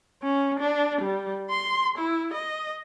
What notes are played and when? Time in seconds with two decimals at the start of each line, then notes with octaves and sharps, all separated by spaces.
0.23 C#4
0.60 D4
1.01 G3
1.50 C6
1.99 E4
2.34 D#5